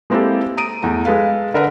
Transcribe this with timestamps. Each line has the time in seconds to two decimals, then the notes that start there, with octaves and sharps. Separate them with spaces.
0.10 G#3 A#3 C4 E4 G4 A4
0.57 A#5 D#6 D7 D#7
0.82 E2 A3 A#5
1.05 G#3 G#4 A4 B4 F5
1.54 D3 A#4 B4 F#5